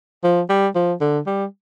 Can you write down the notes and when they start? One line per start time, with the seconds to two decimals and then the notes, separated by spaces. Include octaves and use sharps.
0.24 F3
0.50 G3
0.76 F3
1.01 D3
1.27 G3